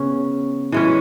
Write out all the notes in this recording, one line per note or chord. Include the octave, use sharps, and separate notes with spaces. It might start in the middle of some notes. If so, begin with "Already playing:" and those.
Already playing: C#3 B3 C#4
E3 G#3 C#4